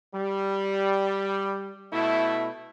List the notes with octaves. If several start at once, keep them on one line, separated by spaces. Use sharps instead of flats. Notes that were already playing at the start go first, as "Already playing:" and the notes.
G3
B2 A3 E4